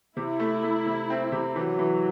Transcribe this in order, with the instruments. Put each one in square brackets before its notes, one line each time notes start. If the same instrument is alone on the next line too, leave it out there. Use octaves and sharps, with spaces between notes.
[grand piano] C3 [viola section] E4
[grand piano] A3
A3
C3
C4
C3
[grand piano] E3 [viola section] F#3
[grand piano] E3